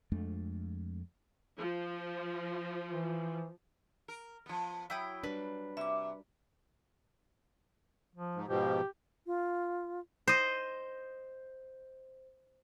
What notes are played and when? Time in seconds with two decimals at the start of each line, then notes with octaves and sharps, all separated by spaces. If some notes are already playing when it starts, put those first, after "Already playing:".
0.12 F2 G#3 A3 D4
1.59 F3
2.92 E3
4.08 A#4
4.46 F3 B3
4.90 F#3 E4 G5 D#6
5.24 G3 D4 B4
5.77 C3 E5 D6
8.15 F3
8.35 G#2
8.48 G#2 B2 F3 G4
9.27 F4
10.28 C5 D#5